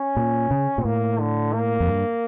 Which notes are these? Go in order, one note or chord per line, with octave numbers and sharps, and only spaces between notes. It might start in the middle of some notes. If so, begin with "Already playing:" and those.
Already playing: C#4
A#2
C#3
A#2
A2 A#3
D3
A#3
F2
G2